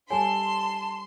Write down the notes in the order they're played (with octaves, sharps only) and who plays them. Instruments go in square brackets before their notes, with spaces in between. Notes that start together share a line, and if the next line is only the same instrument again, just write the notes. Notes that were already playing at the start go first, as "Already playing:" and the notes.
[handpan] G3 G4 A4 [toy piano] C#5 G#5 [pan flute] A5 [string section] C6